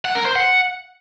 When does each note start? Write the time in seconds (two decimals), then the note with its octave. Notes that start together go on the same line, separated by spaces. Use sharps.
0.05 F#5
0.15 A#4
0.25 C5
0.35 F#5